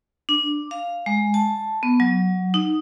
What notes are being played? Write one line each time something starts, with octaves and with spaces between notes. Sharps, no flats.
D4
F5
G#3
A5
B3
F#3
D#4